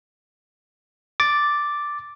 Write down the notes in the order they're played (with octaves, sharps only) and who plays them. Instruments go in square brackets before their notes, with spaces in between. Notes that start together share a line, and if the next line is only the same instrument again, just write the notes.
[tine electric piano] D6 A6